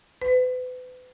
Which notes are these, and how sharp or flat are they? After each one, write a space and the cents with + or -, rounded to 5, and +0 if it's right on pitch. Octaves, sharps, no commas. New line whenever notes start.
B4 +35